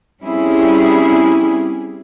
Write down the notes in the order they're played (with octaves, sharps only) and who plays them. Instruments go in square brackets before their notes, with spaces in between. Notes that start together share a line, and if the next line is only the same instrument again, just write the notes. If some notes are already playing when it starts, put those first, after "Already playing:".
[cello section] G3 C4 C#4 E4 G4 G#4